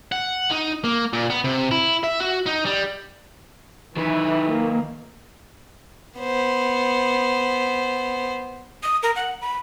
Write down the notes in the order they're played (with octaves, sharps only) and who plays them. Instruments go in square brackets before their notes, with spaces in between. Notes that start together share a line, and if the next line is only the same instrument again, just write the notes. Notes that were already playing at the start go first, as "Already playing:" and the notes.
[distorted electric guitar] F#5
D#4
A#3
A#2
B3
C3
E4
E5
F#4
D#4
G3
[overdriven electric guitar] D#3 B4 [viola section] E3
[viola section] A#3
[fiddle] B3 C5
[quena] D#6
A#4
F#5
B5